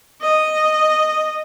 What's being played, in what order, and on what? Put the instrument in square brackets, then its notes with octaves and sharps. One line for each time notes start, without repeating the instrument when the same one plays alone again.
[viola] D#5